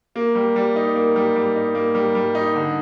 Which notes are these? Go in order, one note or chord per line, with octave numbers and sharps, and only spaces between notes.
A#3
G3
G3
D#4
A#3
G3
G3
D#4
A#3
G3
G3
D#4
D3